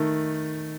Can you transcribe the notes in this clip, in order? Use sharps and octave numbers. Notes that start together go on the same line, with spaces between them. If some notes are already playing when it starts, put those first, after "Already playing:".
Already playing: D#3 A3